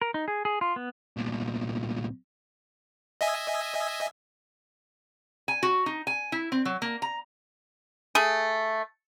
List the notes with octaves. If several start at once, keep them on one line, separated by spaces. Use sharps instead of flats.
A#4
D#4
G#4
G#4
F4
B3
C2 A#2
D#5 E5 G#5
G#5
F#4
D#4
G#5
E4
C4
F#3
A#3
A#5
A3 G#4